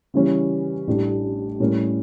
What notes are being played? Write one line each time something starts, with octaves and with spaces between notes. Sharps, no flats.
C#3 E3 G3 C#4
A1 A2 G3 D4 G4
A2 G3 C#4 G4 A#4